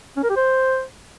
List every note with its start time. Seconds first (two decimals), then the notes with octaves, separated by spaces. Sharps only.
0.17 C#4
0.24 A#4
0.30 G4
0.37 C5